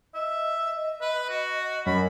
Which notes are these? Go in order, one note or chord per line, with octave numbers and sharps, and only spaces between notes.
D#5 E5
B4
F#4
F#2 B5